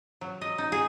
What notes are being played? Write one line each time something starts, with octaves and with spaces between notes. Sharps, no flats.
F#3
D#5
D#4
G#4